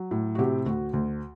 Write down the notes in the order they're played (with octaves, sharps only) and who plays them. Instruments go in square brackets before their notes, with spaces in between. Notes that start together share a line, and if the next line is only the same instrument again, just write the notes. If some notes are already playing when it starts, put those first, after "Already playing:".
Already playing: [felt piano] F#3
A2
F#4
C3 G4
D2 F#4
D2